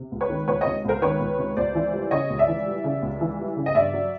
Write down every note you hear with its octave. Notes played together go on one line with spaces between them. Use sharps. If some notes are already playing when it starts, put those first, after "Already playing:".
Already playing: C3
C#2
B4 C#5
D#3
C#2 B4 C#5
C#5 D#5
C3
C#2 A#4 C5
D#3 B4 C#5
C#2
C3
C#2 C5 D5
E3
G3
C#3 C#5 D#5
C#2
D5 E5
E3
G3
C#3
C#2
E3
G3
C#3
D#5
G2 D5 E5
F#3